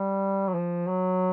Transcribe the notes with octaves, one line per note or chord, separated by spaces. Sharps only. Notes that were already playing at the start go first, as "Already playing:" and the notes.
Already playing: G3
F#3
F3
F#3